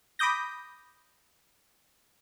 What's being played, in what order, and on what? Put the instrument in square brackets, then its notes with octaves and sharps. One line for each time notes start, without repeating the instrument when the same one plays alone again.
[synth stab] B5 D6 D#6 G6 A#6